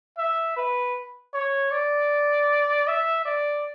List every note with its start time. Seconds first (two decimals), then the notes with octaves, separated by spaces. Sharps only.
0.18 E5
0.56 B4
1.34 C#5
1.71 D5
2.87 E5
3.25 D5